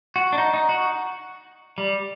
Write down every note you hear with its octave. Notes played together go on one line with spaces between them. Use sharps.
F#4
D4
D#4
D#4
F#4
G3